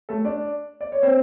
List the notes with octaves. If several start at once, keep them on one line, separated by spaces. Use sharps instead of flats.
A3 A4
D4 D5
D5
C#5
C4 C5